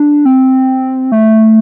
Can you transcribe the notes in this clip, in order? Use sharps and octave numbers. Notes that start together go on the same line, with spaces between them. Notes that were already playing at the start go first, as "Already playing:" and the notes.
Already playing: D4
C4
A3